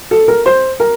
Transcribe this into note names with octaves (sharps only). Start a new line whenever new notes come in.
A4
A#4
C5
A#4